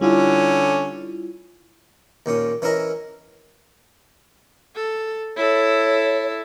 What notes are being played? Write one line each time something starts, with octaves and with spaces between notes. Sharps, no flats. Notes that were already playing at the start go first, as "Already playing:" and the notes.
D3 G3 C#4 E4 F4
D#2 A#2 C#4 D#6
E3 C#4 E4 A#4 D#5
A4
E4 A4 C#5